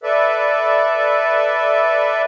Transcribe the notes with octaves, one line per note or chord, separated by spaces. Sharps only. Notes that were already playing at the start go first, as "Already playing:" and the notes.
A4 B4 D5 E5